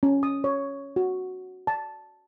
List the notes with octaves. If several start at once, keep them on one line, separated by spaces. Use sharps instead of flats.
C#4
D#6
C#5
F#4
A5